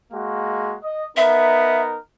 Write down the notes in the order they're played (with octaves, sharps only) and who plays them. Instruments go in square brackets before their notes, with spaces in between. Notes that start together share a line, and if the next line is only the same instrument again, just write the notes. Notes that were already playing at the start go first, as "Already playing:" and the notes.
[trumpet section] G#3 A#3 F#4
D#5
[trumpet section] B3 D#4 A#4 [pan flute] E5